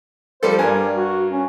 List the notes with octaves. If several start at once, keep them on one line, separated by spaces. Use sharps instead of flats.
F3 G3 A4 C5
G2 G3 A#4 G#5
F#4
C#4